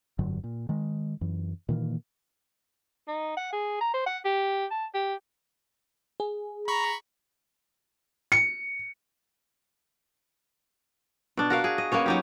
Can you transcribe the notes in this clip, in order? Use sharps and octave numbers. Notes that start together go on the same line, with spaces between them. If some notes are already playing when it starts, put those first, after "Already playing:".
F1 G2 D3 F#3
A#2
D#3 G#3
F#2 E3
A#2 D#3 E3 A#3
D#4
F#5
G#4
A#5
C5
F#5
G4
A5
G4
G#4
A#5 B5 C#6
C#7
B2 D4
F#4 A#4 F5
G#4
D#5
A#3 B3 C#4 C#5
F#3 D#4 G4